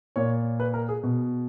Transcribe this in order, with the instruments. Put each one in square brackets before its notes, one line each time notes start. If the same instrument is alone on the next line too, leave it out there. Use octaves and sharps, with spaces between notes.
[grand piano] A#2 C#5
B4
A#4
G#4
B2